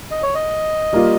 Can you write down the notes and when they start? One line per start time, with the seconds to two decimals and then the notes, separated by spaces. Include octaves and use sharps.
0.11 D#5
0.23 C#5
0.35 D#5
0.93 G3 A#3 F4